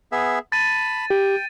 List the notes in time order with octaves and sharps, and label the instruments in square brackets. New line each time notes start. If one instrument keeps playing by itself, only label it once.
[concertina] B3 G#4 E5
[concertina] A5 B5 [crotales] A6 D#7
[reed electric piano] G4 [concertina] G5